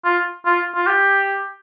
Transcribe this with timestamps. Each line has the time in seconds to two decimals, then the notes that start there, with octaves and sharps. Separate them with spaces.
0.05 F4
0.46 F4
0.76 F4
0.87 G4